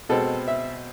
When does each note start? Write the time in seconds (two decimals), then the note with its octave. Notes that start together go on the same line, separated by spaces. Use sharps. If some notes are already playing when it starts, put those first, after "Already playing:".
0.09 B2 G#3 C4 A4
0.48 E5